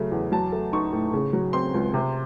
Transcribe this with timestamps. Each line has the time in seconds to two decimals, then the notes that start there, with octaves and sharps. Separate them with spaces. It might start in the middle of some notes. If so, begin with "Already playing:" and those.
Already playing: C#3 F#3 A3
0.12 E2
0.32 F#3 A5
0.52 A3
0.73 D#4 C#6
0.92 A2
1.13 C#3
1.33 F#3
1.53 C4 C6
1.74 C#2
1.94 C3